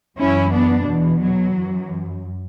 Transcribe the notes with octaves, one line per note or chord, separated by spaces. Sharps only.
F#2 E3 C#4 E4
B3 D4
E2 B2 E3
F#3
F#2 E3